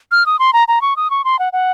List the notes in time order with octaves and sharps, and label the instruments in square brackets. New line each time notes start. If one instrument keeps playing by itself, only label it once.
[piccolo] F6
D#6
C6
A#5
A#5
C#6
D#6
C#6
C6
F#5
F#5